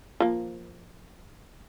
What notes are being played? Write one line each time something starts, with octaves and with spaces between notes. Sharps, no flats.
F3 A#3